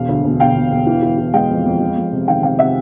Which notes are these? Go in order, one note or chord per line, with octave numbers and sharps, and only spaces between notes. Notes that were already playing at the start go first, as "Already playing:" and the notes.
Already playing: E1 F5
D2
E1
E1 F5 G5
E1
E1
E3
E3
E3
G#3 F5 G5
F2
F2
G#3
F2
C3
D#3 F5 G5
C3 F5 G5
C3 E5 F#5